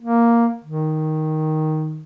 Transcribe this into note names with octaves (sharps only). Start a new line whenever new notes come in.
A#3
D#3